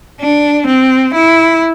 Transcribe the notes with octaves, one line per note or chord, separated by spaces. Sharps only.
D4
C4
E4